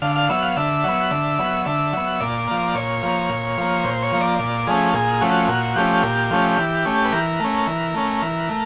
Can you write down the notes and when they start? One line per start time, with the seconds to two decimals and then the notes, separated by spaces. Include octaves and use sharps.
0.02 D3 F5
0.16 F5
0.29 F#3 B3 E5
0.43 F5
0.57 D3 E5
0.84 F#3 B3
1.11 D3
1.39 F#3 B3
1.66 D3 E5
1.93 F#3 B3
2.20 A#2 D5
2.48 F3 A#3
2.75 A#2 C#5
3.03 F3 A#3
3.30 A#2
3.58 F3 A#3
3.84 A#2 C5
4.02 C#5
4.12 F3 A#3
4.21 D5
4.39 A#2 D5
4.67 F3 A3 C#4 G#4
4.94 A#2 G#4
5.21 F3 A3 C#4 F#4
5.48 A#2 F#4
5.76 F3 A3 C#4 G4
6.03 A#2
6.31 F3 A3 C#4
6.58 E3
6.85 A3 C#4
7.05 B4
7.12 E3 A#4
7.40 A3 C#4
7.67 E3
7.94 A3 C#4
8.22 E3
8.49 A3